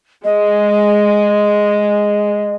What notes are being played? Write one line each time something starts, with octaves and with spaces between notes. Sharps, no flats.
G#3 D#5